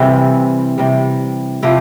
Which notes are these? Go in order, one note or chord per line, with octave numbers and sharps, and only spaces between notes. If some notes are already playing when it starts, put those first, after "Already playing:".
Already playing: C3 E3 G3 C4 E4
C3 G3
C3 F3 E4 G4